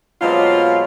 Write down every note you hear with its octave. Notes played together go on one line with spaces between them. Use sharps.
B2 F#3 G#3 C4 F4 D5